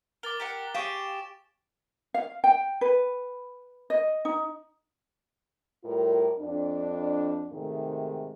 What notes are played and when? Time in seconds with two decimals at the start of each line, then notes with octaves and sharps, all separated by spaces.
0.23 A#4 D6 A6 G7
0.40 G4 A#4 F#5
0.74 G4 G#4 C#5 F5 D7 E7
2.14 F5
2.44 G5
2.81 B4
3.90 D#5
4.25 D#4
5.84 A2 G3 F4 A#4
6.39 F2 D4
7.51 G#2 C3 D#3 G#3 A3